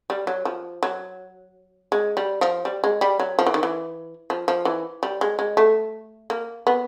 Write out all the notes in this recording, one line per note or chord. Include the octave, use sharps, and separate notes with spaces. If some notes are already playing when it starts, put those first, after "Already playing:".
G3
F#3
F3
F#3
G#3
G3
F3
G3
G#3
G3
F#3
F3
E3
D#3
E3
F3
F3
E3
G3
G#3
G#3
A3
A#3
B3